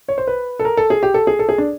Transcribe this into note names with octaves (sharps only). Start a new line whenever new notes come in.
C#5
C5
B4
A4
A#4
A4
G#4
G4
A4
G#4
A4
G#4
D4